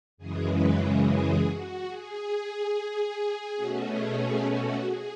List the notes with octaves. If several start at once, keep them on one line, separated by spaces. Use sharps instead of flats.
F#2 C#3 E3 G#3 G#4
B4
G#4
G#4
F#4
G#4
B2 A3 C#4 F#4
G#4
G#4
F#4
G#4